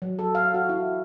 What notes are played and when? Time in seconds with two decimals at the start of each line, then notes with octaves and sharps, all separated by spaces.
0.02 F#3
0.19 A4
0.35 F5
0.54 F#4
0.69 E4